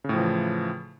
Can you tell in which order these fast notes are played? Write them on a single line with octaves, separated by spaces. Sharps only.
C#3 A2 F3 E3